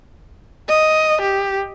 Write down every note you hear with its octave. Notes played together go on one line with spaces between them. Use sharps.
D#5
G4